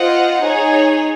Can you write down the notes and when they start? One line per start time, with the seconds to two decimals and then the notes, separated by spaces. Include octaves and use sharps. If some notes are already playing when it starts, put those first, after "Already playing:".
Already playing: F4 C5 D#5 F#5
0.42 D#4 G#4 C#5